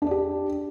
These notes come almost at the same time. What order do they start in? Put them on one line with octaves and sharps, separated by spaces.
D4 D5 G4